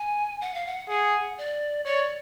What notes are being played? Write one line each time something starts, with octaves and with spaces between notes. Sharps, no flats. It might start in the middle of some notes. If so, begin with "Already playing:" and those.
Already playing: G#5
F#5
F5
F#5
G#4 F#5
D5
C#5 D5